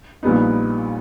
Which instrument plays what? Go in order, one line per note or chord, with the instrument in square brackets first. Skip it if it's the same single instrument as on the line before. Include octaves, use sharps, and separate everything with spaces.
[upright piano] A#1 A#2 G3 B3 D#4